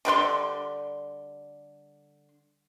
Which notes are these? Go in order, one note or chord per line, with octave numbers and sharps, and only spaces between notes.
D3 G3 B4 C6